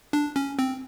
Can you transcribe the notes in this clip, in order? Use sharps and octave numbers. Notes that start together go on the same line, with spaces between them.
D4
C#4
C4